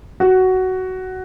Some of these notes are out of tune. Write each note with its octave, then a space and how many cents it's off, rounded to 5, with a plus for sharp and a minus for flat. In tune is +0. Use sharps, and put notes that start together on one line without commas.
F#4 +10